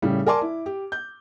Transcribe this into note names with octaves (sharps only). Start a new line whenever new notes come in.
A2 C#3 G3
A#4 D5 G#5 A5 C6 D6
E4
G4
G6